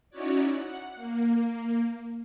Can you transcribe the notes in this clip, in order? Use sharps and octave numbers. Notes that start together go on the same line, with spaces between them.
C#4 D#4 E4 F#4 C#5 D5
F#5
A#3